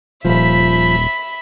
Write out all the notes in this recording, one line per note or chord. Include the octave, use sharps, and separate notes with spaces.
D#1 F3 E5 B5